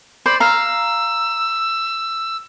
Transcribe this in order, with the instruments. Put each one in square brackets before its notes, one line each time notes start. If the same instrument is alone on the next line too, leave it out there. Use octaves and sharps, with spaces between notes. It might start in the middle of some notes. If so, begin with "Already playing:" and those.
[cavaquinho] C5 D5 [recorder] B5
[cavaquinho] F5 A#5 [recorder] E6